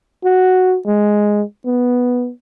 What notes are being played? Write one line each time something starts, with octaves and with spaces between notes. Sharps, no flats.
F#4
G#3
B3